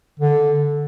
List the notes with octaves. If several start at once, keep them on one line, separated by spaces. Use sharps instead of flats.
D3